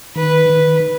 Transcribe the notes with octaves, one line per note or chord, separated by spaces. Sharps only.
D#3 B4
D#3